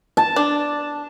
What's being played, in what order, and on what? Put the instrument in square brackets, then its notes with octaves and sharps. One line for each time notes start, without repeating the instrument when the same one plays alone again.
[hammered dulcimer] A5
[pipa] D4